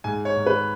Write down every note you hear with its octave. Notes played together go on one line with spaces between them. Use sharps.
G#2 G#5
C#5
G#2
B4